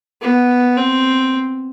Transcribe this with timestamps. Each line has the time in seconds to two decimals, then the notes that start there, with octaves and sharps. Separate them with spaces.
0.22 B3
0.77 C4